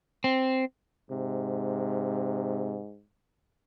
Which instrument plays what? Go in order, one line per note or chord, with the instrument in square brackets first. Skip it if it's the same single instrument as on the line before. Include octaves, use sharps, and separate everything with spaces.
[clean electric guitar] C4
[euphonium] G#2 [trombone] C3